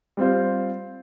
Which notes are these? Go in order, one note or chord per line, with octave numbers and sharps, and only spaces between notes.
G3 C4 F4 C5